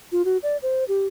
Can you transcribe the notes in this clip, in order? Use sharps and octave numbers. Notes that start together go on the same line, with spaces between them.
F4
F#4
D5
C5
G4